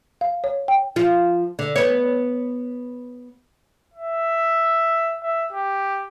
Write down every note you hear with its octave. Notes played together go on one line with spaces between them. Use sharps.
F5
C#5
G5
F3 F4
D3
B3 C#5
E5
E5
G4